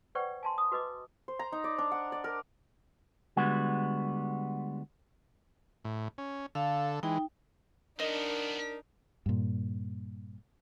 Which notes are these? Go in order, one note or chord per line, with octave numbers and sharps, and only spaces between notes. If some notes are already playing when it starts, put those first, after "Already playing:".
B4 C5 D5 F#5 G5 C#6
G#5 A5 C6
D#6
F#4 B4 D#5 D6
C5
A#5
D#4
D5
D4
F#5
D5
A#4
D3 G3 G#3 B3 F#4
A2
C#4
D3 A4 F5
E3 G#3 D#4 G5
F3 B3 D4 D#4 A#4 D#5
G2 A#2